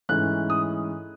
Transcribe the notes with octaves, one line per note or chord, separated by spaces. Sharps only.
G#2 E3 A3 C#4 F#6
D#6